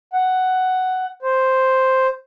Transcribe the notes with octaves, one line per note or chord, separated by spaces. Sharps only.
F#5
C5